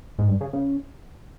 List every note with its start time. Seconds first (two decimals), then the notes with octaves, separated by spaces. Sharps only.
0.19 G#2
0.28 G2
0.41 C#3
0.53 C#3